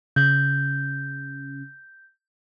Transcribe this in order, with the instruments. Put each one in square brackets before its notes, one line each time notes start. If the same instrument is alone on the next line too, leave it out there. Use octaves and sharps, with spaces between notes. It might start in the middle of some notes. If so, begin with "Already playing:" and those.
[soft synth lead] C#3 [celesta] G6